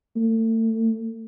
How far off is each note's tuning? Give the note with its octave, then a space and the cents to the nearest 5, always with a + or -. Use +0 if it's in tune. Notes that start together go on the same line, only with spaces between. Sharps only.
A3 +35